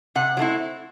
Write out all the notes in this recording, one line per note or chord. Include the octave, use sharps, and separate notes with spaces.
C3 F#5
F#3 A3 C4 E4